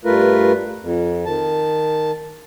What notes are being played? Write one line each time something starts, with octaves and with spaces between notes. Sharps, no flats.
G2 A3 F4 A#4 B4
F2
D#3 A5